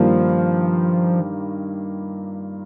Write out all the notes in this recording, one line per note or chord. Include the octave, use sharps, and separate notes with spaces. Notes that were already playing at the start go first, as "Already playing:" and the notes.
Already playing: G2 D#3 F3 G3 A#3 F4